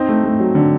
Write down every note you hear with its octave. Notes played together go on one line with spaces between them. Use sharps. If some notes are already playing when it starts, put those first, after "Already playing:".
Already playing: C4 D#4
A3
A3
F#3
D3